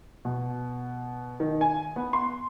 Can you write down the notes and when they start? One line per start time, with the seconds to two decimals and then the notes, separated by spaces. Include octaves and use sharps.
0.25 B2
1.40 D#3
1.61 G#5
1.96 B3
2.13 C6